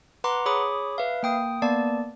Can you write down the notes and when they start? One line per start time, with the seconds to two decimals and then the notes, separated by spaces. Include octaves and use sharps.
0.24 B4 F#5 A#5 C6 D6
0.46 G#4 C#5 B5 D6 D#6
0.98 B4 E5 F5
1.23 A#3 G5 D#6
1.62 A#3 B3 D5 A5